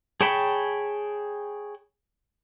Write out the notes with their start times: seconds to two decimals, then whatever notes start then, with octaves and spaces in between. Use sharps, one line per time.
0.21 G#4 C#5 G5 A5 B5